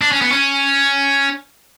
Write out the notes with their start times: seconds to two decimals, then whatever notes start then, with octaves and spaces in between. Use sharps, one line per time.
0.01 D4
0.12 C#4
0.22 B3
0.32 C#4